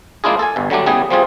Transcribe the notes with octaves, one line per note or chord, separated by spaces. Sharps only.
G#3 A#3 D4 E4 F4 G#4
A4 G#5
G1 G2
D3 F#3 G3 A3 D4
C#3 E3 G3 B3 G#4
F3 G3 C4 F4 G#4